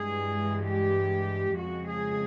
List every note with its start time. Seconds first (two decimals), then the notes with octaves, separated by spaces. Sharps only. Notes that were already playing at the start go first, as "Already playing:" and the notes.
Already playing: G2 E3 G#3 G#4
0.65 G4
1.59 F2 C#3 F3 G#3 F#4
1.90 G#4